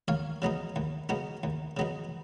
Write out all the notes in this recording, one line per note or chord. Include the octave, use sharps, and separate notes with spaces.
D#2 C#5 F5
C#3 F#3 B3 D#4
D#2
C#3 F#3 B3 D#4
D#2
C#3 F#3 B3 D#4